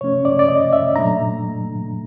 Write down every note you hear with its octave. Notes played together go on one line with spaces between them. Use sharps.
C3 F3 A3 C#4 C#5
D5
D5
D#5
E5
A#2 F#3 A3 D4 A#5